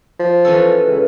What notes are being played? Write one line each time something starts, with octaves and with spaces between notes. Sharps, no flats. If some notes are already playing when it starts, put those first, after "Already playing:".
F3
E3 C#4 A4
C#2